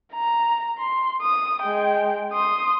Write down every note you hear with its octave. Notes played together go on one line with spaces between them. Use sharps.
A#5
C6
D#6
G#3 G5
C6 D#6